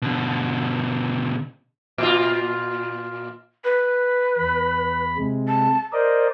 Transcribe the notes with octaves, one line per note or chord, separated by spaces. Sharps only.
B2 D3
A#2 F4
B4
E2 B5
C3 G#3
A5
A#4 C5 D5 D#5